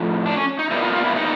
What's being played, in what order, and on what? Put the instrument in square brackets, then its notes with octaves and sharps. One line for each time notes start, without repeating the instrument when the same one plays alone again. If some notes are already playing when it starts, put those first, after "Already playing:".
Already playing: [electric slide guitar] A2 F3 A3
D4
C#4
D#4
A#2 G3 B3 E4
F4
F4
E4
D#4